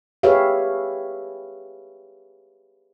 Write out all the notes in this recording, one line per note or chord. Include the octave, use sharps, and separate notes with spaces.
G4 G#4 B4 C#5 E5 F5